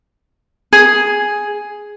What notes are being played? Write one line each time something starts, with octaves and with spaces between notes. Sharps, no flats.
G#4